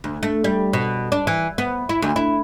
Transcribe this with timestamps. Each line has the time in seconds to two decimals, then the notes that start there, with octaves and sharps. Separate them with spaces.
0.04 D2
0.23 A3
0.44 G3
0.73 B2
1.12 D4
1.27 E3
1.58 B3
1.89 E4
2.02 D2
2.16 E4